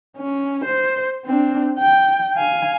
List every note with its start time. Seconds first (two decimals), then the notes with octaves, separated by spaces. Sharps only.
0.17 C#4
0.65 C5
1.25 C4 D4
1.79 G5
2.36 F5 G#5